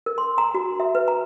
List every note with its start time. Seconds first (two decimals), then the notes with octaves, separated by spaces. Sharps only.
0.06 A#4
0.18 C6
0.38 A#5
0.54 F#4
0.80 E5
0.95 B4
1.08 A#5